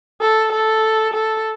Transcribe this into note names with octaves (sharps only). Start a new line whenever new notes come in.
A4
A4
A4